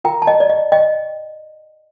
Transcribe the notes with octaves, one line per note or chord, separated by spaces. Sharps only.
F4 A#4 G5 A#5
A5
D#5 G5
D5
D#5
D#5 G5